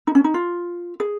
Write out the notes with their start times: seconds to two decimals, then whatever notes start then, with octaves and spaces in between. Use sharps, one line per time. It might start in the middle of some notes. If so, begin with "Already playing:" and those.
0.07 D#4
0.15 C#4
0.24 D#4
0.34 F4
1.00 G#4